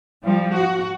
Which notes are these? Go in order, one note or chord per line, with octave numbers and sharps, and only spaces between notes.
F3 G3
F#4